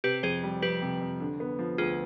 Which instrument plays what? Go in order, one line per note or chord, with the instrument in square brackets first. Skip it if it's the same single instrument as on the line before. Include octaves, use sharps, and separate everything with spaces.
[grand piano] C3 [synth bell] G4 B4
[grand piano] F2 [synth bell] G#4 C5
[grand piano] G3
[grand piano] F2 [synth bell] G4 B4
[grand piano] C3
F2
D3
B3
F3
[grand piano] D2 [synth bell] F4 G#4